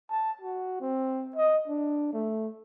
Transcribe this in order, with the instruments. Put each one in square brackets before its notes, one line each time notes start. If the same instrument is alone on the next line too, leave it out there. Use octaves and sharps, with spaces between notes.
[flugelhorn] A5
F#4
C4
D#5
D4
A3